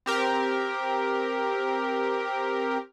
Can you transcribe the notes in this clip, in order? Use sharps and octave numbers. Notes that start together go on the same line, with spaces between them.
C4 G4 A#4